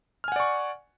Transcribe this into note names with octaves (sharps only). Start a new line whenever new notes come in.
D5 F#5 G#5 C#6 F6